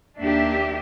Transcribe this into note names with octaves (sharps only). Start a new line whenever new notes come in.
D#2 A#3 D4 G4 E5